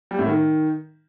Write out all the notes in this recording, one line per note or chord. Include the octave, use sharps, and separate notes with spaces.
G3
A2
D#3